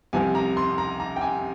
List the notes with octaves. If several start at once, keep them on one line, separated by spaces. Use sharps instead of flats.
C2 C3 F3 G#5
A#5
C6
A#5
A#5
G5
G#5